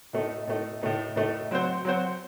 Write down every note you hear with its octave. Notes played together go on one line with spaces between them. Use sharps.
A2 A3 D#4
A2 A3 D#4
A2 A3 D#4
A2 A3 D#4
F#3 C4 F#4 C5
F#3 C4 F#4 C5